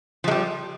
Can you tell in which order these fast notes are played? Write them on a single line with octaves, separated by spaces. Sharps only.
F3 G#3 G3